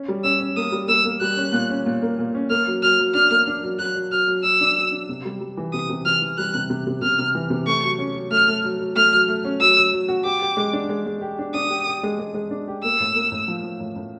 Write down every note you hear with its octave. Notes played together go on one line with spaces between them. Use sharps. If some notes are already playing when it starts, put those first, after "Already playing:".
Already playing: C#4
G3
C#4 E6
C#4
A#3 D#6
G3
A#3 E6
A#3
G3 F#6
C#4
A#2
C#4
A#2
A#3
A#2
C#4
A#3 F6
F#3
F#3 F6
F#3
D4 F6
A#3
D4
F#3
F#3 F#6
F#3
F#3 F6
F#3
F#3 E6
D4
F#3
D4
C3
G3
G3
E3
C3 D#6
C3
E3 F6
E3
G3 F#6
C3
C3
C3
C3 F6
C3
E3
C3
A3 C#6
F#3
C#4
F#3
A3 F6
A3
F#3
F#3
A3 F6
F#3
A3
C#4
F#3 E6
F#3
F#3
F#4
G4 D6
G4
G#3
D4
G#3
G#3
G4
D4
D4 D#6
G4
G4
G#3
G#3
G#3
D4
G4
A#3 E6
A2
A#3
A2
F3
F3
A2
A2